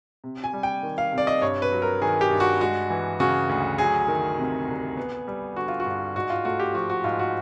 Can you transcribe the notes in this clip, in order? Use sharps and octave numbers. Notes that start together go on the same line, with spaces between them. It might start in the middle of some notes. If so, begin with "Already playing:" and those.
C3
G#5
G3
G5
D#3
F5
C3
D5
D#5
G2 C#5
B4
F#3
A#4
D#3 G#4
G4
G2
F#4
G#3 F#4
E3
C#3 F#4
D2
F#3 G#4
D#3
C3
C2
B3
G3
D3 F#4
F4
F#4
G2
G#2 F#4
F4
A3 F#4
G4
F3 F#4
F#4
G#2 F4
F#4